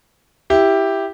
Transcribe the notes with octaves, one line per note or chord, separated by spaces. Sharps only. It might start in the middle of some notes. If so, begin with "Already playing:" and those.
E4 G4